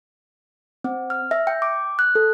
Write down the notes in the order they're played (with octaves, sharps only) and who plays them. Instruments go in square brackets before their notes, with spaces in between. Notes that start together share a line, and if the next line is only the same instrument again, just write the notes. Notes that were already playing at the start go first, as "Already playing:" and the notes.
[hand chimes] C4
F6
E5
G5
D6
F#6
A4